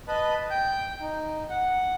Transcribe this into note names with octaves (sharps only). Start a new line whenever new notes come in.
B4 D#5 A5 B5
G5 G6
D#4
F#5